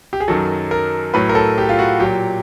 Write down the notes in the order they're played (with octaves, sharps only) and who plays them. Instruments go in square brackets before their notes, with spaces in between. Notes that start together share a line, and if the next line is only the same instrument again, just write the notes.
[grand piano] G4
G#4
F#2 D#3 F#3 A4
A#4
A2 F#3 B4
A#4
A4
G4
F4
F#4
A#2 F#3 G4